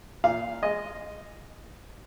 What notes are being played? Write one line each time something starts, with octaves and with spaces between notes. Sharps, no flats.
A#2 F5
G#3 D#5